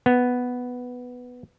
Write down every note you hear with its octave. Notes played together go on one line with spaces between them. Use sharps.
B3